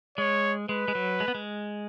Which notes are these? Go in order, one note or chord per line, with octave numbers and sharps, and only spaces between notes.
G#3 C#5
G#3 B4
G#3
F#3
G#3
B3
G#3